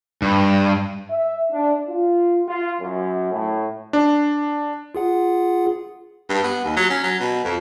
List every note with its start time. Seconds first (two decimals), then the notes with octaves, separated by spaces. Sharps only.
0.22 G2
1.10 E5
1.51 D4
1.87 F4
2.47 F4
2.80 F#2
3.32 A2
3.93 D4
4.95 F4 G#4 F#5
6.30 G2
6.44 B3
6.65 D#2
6.77 F#3
6.90 C#4
7.04 F#3
7.20 B2
7.45 F2